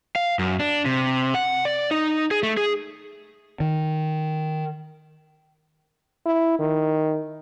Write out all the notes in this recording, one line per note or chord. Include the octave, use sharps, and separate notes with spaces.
F5
F#2
D4
C3
F#5
D5
D#4
G#4
A3
G#4
D#3
E4
D#3